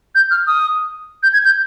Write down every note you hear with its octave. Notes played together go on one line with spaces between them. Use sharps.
G6
F6
D#6
G6
G#6
G6